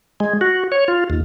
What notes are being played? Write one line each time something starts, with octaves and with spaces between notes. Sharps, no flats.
G#3
F#4
C#5
F4
D#2